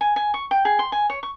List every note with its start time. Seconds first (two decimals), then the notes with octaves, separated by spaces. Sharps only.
0.01 G#5
0.16 G#5
0.34 C#6
0.51 G5
0.65 G#4
0.79 C6
0.92 G#5
1.10 C#5
1.23 C#6